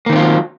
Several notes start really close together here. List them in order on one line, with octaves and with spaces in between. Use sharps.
A#3 D#3 C4 F4 F#3